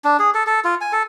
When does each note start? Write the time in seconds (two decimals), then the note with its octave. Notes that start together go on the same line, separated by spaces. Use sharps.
0.04 D4
0.19 G#4
0.34 A4
0.47 A4
0.64 F4
0.81 G#5
0.92 A4